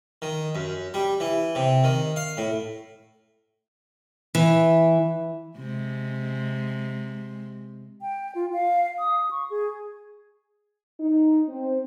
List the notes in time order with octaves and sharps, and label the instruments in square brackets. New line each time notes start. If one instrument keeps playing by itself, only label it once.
[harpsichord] D#3
F#2
G3
E3
C3
D#3
F5
A2
[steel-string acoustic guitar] E3
[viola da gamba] C3 G#3
[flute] G5
F4
F5
D#6
C#6
G#4
[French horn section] D#4
C4